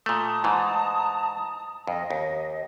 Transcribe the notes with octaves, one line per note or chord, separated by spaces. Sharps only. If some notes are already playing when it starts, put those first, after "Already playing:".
A#2 A3 A5 A#5 D#6
G#2 E3
F2 D#5
D#2